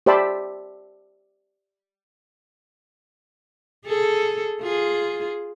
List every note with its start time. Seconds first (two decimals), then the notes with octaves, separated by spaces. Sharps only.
0.06 G4 C5 D5 E5 A5 B5
3.86 G#4 A4
4.62 F4 G#4